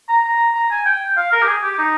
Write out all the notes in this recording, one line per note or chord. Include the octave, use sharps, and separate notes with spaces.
A#5
A#5
A#5
G#5
G5
F5
A#4
G4
G#4
G4
D#4